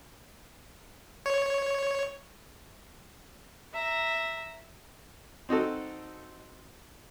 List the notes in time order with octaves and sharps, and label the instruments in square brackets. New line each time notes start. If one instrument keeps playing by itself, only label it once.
[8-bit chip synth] C#5
[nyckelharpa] E5 A#5
[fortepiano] C4 D#4 F#4 A4